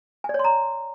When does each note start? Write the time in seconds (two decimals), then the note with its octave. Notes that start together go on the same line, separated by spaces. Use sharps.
0.24 G#5
0.29 D5
0.34 C#5
0.39 C6
0.44 A#5